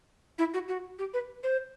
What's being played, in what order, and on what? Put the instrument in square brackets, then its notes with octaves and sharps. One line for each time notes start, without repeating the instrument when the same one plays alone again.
[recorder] E4
F#4
F#4
G4
B4
C5